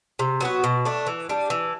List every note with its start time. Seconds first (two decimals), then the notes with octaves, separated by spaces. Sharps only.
0.19 C3
0.41 F#3 B3 F#4
0.64 B2
0.85 A3 D4
1.07 E3
1.29 G3 D4
1.50 E3